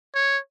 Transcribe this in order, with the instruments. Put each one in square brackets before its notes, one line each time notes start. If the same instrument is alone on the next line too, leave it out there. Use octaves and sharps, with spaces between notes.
[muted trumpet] C#5